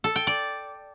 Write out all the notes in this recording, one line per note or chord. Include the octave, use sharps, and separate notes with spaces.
A4
G5
D5